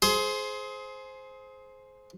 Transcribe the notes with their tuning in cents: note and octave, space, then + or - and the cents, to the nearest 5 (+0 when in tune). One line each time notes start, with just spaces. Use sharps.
G#4 +25 C5 +0